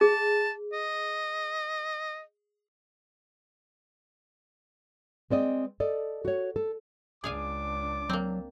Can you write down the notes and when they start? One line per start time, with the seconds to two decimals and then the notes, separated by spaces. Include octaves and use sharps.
0.01 G#4 A5
0.73 D#5
5.30 G#3 C4 D5 D#5
5.80 A4 D5 D#5
6.25 F#4 C#5
6.56 A4
7.24 C#2 D4 G#4 F5 G#5 D6
8.09 F#3 A#3 C4